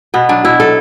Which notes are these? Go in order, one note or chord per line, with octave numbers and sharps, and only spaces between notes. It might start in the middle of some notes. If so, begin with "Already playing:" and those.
B2 B3
F#3 D4
B2 E4
F#3 A4